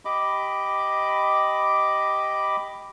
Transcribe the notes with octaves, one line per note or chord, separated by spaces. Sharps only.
G4 D#5 B5 D6